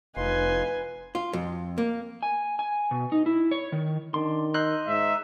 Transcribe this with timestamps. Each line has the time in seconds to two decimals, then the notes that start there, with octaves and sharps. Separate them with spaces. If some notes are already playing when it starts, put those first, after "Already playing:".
0.17 F1 D#4 F4 B4 G#5 C6
1.15 F4
1.33 F2
1.78 A#3
2.23 G#5
2.59 G#5
2.91 B2
3.12 D#4
3.26 E4
3.51 C#5
3.72 D#3
4.14 D#3 D4 C6
4.54 D#4 D#5 C6 E6 F#6 G6
4.87 G#2 E5